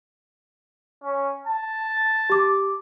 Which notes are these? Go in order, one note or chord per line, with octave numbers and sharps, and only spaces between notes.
C#4
A5
G4 D6